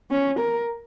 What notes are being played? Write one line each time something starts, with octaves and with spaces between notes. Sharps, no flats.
C#4
A#4